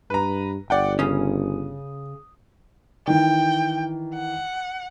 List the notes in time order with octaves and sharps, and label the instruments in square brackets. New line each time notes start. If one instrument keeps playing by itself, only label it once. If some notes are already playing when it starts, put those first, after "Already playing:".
[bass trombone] G2 [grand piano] B4 A#5
[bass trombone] G1 [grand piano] D5 F#5 G5
[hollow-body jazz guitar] C#3 C#4 [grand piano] D#6
[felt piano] D#3 E3 [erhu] G5
[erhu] F#5